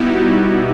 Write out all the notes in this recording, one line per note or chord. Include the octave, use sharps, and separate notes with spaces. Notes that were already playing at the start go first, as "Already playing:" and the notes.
Already playing: B2 G3 B3 D#4 E4 F#4 G4